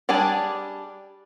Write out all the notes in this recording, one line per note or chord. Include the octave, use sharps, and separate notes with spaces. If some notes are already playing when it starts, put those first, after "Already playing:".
G3 D4 G#4 G#5 A5